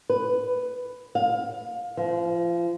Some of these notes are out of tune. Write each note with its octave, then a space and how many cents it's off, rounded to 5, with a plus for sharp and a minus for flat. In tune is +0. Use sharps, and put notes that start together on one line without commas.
B4 +10
F5 +25
F3 -30